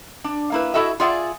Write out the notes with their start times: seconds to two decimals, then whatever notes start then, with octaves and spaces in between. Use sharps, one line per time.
0.24 D4
0.52 A#3 E4 B4
0.74 E4 F#4 A4 D#5 E5
1.00 F4 G#4 D5 E5 F#5 G#5